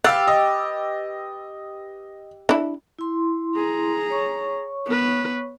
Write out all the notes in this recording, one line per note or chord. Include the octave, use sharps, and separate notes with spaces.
G4 B4 F5 F#5 E6 A6
D#5
D4 E4
E4 C6
G#4 A#5
C#5 C#6
B3 B4